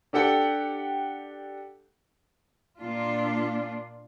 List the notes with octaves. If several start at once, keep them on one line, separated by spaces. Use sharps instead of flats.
D4 G4 A4 F#5 G5
A#2 A#3 D4 F4